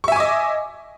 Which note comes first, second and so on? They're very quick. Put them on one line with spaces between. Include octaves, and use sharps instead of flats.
C#6 E5 G#5 D6 D#5